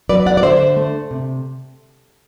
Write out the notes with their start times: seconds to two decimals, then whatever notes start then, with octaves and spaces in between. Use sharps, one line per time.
0.09 F#3 B4 D5
0.26 D5 F#5
0.37 D5
0.43 D3 C5 E5
0.77 A3
1.11 C3